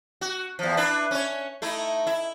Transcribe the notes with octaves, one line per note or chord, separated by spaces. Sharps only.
F#4
E2 F3
D4 E4 B4
C#4 C#5
A3 D#4 E4
E4